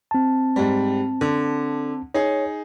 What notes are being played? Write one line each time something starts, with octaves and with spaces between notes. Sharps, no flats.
C4 A5
G#2 G3
D3
D#4 G#4 C#5